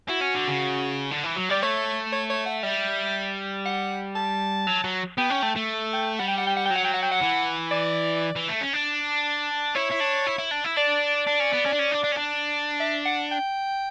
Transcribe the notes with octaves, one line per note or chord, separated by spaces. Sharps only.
E4 F#4
C#4
D3
C#3
D3
E3
F#3
G3 D5
A3 C#5
C#5
C#5
F#5
G3 E5
F#5
A5
F#3
F#3
B3 G5
C#4
A3
A3
G5
G3 F#5
G5
F#5
G5
F#5
G5
F#3
F#5
G5
F#5
G5
F#5
E3
D5
E3
A3
C#4
D4
E4 C#5
E4
D4
E4
E4
D4
E4
D4 D5
D4
C#4
B3
C#4
D4
C#4
D4
D4
C#4
D4
E5
F#5
G5